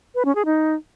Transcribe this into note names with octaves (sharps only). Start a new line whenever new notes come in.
B4
C#4
G#4
D#4